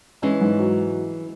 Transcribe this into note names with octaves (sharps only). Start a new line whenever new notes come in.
E3 G#3 C#4
G#2
F#3